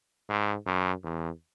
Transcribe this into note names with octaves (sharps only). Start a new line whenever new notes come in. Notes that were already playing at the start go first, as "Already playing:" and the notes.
G#2
F#2
E2